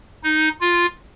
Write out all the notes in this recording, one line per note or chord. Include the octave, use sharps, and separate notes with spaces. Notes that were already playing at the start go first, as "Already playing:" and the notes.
D#4
F4